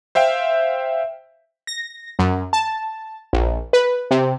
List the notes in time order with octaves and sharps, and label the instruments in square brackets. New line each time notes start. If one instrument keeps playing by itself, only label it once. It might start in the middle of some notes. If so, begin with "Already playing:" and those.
[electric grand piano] C5 E5 F5 G5
[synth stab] A#6
F#2
A5
A#1
B4
C3